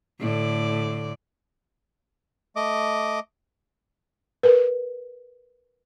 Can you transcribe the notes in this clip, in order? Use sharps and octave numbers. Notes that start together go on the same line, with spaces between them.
A2 D3 D5
A3 D#5 D6
A#4 B4